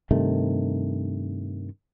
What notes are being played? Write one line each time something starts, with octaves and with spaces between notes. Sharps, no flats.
G2 C3 D#3 A3